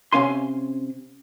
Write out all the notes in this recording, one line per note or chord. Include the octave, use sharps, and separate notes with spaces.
C3 A#3 C#4 F5 G#5 C6